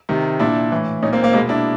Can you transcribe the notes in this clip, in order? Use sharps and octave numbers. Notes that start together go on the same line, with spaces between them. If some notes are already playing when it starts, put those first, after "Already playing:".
C3 D#3
A#2 D4 E4
A2 E3
A#2 C#4 D#4
A#3 C4
A#3 C4
B2 G#3 A#3
D4 E4